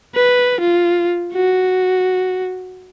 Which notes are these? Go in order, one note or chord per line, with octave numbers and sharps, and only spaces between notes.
B4
F4
F#4